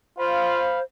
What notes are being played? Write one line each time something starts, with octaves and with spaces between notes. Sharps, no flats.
F4 C5 F5 B5